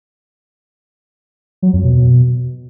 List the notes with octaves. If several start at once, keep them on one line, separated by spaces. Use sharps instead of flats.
F#3
F2
B2